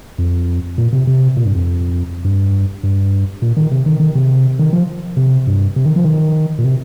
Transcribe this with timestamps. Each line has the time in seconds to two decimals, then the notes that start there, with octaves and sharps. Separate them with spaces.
0.18 F2
0.78 A#2
0.93 C3
1.07 C3
1.37 A#2
1.45 G2
1.55 F2
2.24 G2
2.83 G2
3.42 A#2
3.57 D#3
3.71 C3
3.86 D#3
4.00 D#3
4.15 C3
4.59 D#3
4.73 F3
5.17 C3
5.47 G2
5.76 C3
5.85 D#3
5.96 F3
6.05 D#3
6.59 A#2
6.64 C3